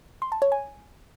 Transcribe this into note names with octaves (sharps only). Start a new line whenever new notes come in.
C6
A5
C#5
G#5